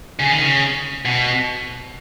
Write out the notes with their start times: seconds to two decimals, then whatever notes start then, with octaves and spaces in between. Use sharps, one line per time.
0.19 C#3
0.31 D#3
0.42 C#3
1.05 B2